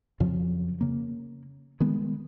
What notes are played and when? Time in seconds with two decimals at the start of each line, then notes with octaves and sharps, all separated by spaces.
0.20 F2 C#3 F3 F#3
0.81 C#3 A#3
1.80 D#3 G3 G#3 B3